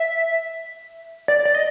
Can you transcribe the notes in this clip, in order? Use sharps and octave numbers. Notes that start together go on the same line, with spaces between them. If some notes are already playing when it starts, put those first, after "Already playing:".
Already playing: E5
D5
D5
D#5